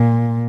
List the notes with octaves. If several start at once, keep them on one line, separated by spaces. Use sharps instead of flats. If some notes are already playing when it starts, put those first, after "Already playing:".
Already playing: A#2